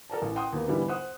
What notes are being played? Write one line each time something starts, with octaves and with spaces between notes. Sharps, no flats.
A4 A#4 D5 A5
A1
F#5 G5 C6 D#6
D#2 A#3 B3
G#2 D3 E3 G3 B3 E4
C5 F#5 D#6 F#6